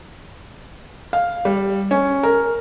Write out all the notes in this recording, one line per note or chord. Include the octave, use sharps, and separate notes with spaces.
F5
G3
C#4
A#4